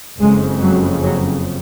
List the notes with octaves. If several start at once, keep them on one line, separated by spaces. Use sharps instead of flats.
F#1 F2 C#3 G#3
F#3
F#3